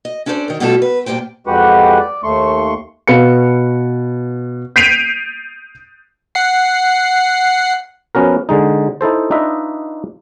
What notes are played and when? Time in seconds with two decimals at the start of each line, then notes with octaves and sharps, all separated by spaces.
0.05 D#5
0.26 C#4 D4 E4 A4 C5 D5
0.48 D#3 A#4
0.60 B2 G3 A3 F4 G4 A4
0.82 B4
1.06 G2 A#2 G4 C5 G5
1.47 F2 G#3 F#4 G4 B4 F#5
1.99 D5
2.24 D#2 A3 C6 C#6
3.08 B2 B4 F5 C#7
4.76 G6 B6 C7 D7 D#7 F7
6.35 F#5 C7
8.15 F3 B3 C#4 F#4 A#4
8.49 D3 G#3 D#4
9.01 D#4 E4 A4 C5
9.31 D4 D#4 F4 B4 D#5 E5